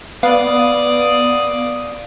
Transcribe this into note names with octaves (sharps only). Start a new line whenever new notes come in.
B3 D5 F5 D#6